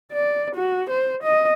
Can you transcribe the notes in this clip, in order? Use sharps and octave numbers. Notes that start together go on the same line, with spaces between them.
D5
F#4
C5
D#5